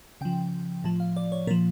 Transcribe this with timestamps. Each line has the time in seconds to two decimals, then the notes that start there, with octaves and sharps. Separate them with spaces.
0.21 C#3 F3 G5
0.84 A2 F3 A5
1.00 F5
1.17 D5
1.32 C#5
1.47 A#2 A#4
1.51 F3